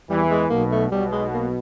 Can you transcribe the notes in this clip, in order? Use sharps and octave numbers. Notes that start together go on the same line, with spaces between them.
E2 E3 G3
G#3
B1 B2 A#3
A3
B1 B2 G3
G#3
A#3